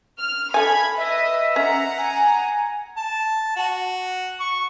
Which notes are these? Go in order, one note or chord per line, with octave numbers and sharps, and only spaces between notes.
F6
A4 G#5 B5 G#6
B4 D#5 E5
C#4 F#5 A#5
G#5
A5
F#4
C#6